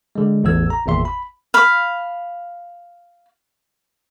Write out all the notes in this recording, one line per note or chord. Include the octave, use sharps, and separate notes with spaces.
D3 G#3
A1 E2 A2 A4 E6 G#6
A#5
G#1 E2 A#2 E5 C6
B5
F5 B5